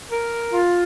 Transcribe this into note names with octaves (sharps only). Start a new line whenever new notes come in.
A#4
F4